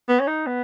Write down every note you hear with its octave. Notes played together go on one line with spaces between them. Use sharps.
B3
C#4
D#4
B3